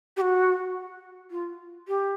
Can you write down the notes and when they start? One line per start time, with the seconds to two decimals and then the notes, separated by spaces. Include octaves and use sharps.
0.17 G4
0.21 F#4
1.31 F4
1.88 G4